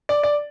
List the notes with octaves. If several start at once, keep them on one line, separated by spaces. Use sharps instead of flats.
D5
D5